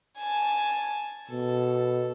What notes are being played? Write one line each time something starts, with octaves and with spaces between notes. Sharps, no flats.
G#5 A5
B2 A4